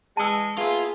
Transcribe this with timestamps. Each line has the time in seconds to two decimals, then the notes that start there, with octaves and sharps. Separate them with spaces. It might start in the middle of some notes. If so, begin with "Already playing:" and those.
0.17 E3 G#3 A5 E6
0.58 A#3 B3 F4 G#4 E5